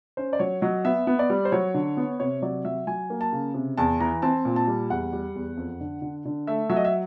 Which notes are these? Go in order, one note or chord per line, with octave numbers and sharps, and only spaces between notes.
C#4 C5
D5
F#3 C#5
F#3 D#5
B3 E5
B3
D5
G3
C5
F#3 C#5
D3
B3
C3 C#5
F#3 D5
F#3 E5
F#3 G#5
A#3
A5
C#3
C3
E2 A5
E3 A#5
C4 A5
A#2
A5
G3
E2 F#5
G3
E2
F2
D3
D3
D3
A3 E5
F#3 E5
D#5
E5